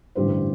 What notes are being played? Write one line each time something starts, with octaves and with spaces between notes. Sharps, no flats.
A1 G2 D3 G3 G4 C5